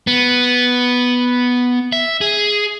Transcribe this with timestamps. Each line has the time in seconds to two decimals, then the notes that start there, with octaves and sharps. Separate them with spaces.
0.07 B3
1.92 E5
2.21 G#4